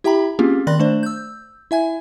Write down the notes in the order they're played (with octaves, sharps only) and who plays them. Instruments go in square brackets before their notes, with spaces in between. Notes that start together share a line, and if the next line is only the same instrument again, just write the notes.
[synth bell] E4 G4 E5 G5 A#5 B5
A#3 C4 C#4 F4 G4 G#4
D#3 D5 B5 C6 F#6 A#6
A3 D4 C5 D5
E6 G6
E4 E5 G#5 G#6